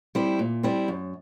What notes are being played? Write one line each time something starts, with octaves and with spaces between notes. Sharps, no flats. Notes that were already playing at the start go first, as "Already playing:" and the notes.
G3 C4 E4
A#2
G3 C4 E4
F#2